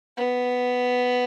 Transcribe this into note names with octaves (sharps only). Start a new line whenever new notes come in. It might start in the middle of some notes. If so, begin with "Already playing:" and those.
B3